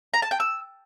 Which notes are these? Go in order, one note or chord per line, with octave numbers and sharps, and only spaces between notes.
A#5
A5
G5
E6